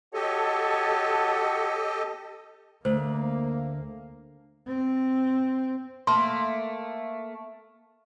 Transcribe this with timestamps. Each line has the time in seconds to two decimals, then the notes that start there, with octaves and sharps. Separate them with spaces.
0.14 F#4 G4 A4 C#5 D#5 A5
2.85 D2 A#3 C5
4.67 C4
6.07 A3 A#3 C6